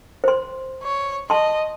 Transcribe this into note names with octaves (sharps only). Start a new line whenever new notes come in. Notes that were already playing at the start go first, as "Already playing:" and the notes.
C5 C6
C#5
D#5 A5 C6